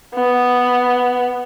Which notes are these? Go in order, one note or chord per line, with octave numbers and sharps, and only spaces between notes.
B3